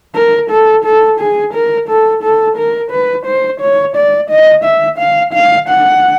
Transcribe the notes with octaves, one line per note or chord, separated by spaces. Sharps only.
A#4
A4
A4
G#4
A#4
A4
A4
A#4
B4
C5
C#5
D5
D#5
E5
F5
F5
F#5